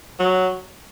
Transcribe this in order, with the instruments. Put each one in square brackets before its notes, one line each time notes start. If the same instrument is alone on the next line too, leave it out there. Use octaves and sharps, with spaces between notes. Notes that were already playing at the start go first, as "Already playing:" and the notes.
[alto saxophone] F#3